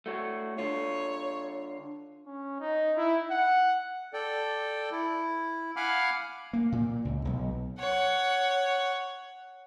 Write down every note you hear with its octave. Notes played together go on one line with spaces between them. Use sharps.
A3 F#4 C#5
D3 F4 C#5
C#4
D#4
E4
F#5
A4 D5 G5
E4
F5 F#5 G#5 B5 D6 F6
A#3
A#2
C#2
B1
C#5 F#5